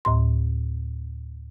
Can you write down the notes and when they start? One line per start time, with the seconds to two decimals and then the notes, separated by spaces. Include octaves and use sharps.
0.05 D2 A2 C6